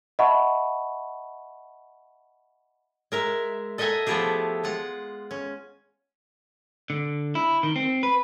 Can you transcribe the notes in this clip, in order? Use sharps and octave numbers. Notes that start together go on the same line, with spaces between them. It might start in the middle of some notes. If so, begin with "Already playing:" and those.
D#5 E5 F#5 A5 B5 C#6
G#3 A#4 E5
A4 D#5 E5 F#5 G#5 A#5
F3 A3 B3 E4 G4 G#4
G#3 F4 F#5
C#4
D3
E4
D#3
C4
B4